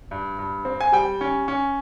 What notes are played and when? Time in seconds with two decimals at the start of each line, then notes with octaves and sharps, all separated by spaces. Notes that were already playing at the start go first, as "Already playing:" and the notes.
0.11 G2
0.39 G2
0.65 C4
0.81 G#5
0.92 G3 G5
1.21 C#4
1.48 C#4